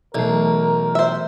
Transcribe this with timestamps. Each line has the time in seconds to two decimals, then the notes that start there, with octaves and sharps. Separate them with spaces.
0.15 B1 E3 A3 A#4
0.95 C5 E5